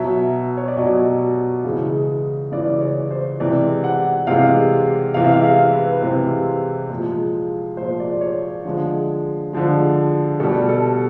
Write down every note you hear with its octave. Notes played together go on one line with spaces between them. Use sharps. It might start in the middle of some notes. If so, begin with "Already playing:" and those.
Already playing: B2 F#3 E5
C#5
D5
B2 F#3 D#5
C#3 E3 G#3
C#3 E3 G#3 D5
C#5
C5
C3 E3 G#3 D5
F#5
C3 E3 G#3 F5
C3 E3 G#3 F5
E5
F5
F5
B4
B4
C3 E3 G#3 C5
A#2 F3 G#3
A#2 F3 G#3 C5
D5
C#5
D3 F3 G#3
D3 F3 G#3
B2 G3 A4
A4